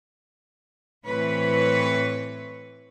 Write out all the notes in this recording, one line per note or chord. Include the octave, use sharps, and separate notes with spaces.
A2 E3 C4 B4 C#5